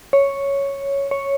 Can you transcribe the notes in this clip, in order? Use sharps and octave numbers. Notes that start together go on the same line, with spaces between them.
C#5
C#5